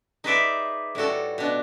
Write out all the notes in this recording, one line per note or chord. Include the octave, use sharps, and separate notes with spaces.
D#4 G#4 B4 C5 D5 E5
A2 G3 F#4 A4
B2 D4